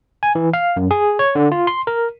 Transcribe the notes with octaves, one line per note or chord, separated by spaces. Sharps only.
G#5
E3
F5
F#2
G#4
C#5
D3
F4
C6
A#4